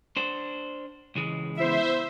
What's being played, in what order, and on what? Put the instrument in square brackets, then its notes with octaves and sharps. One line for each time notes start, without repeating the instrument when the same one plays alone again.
[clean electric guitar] D4 C5
C#2 E3 G#3
[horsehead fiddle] B3 E4 [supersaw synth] C5 E5